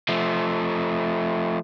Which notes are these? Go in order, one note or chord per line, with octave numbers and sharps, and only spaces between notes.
F3 A3